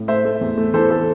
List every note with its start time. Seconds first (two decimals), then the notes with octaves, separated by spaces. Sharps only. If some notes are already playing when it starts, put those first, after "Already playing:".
Already playing: A2
0.08 A3 C5 E5
0.25 A3
0.41 E2
0.58 A3
0.74 E3 A4 C5
0.91 A4